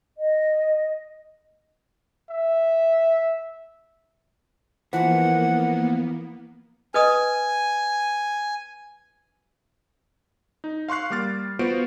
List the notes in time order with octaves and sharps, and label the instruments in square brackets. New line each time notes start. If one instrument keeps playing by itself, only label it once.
[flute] D#5
[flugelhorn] E5
[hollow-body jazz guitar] E3 [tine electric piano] F3 [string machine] A#3 B3 [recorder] F#5
[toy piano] B4 D#5 D#6 [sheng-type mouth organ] G#5
[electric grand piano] D#4
F5 C6 C#6 F#6 C7
G3 A#3 D6 F6 A6
B3 F4 F#4 C5 D7